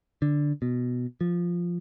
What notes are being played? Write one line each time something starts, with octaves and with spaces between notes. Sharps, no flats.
D3
B2
F3